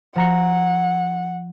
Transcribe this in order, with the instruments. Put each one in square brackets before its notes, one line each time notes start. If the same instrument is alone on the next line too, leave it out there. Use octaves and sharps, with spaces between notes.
[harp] F3 A#5 C#7 [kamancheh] F#5